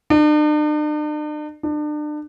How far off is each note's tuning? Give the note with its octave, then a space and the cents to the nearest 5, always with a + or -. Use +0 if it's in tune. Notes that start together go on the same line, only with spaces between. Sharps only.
D4 +45
D4 +35